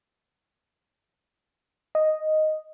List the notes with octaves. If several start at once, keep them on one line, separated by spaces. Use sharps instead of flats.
D#5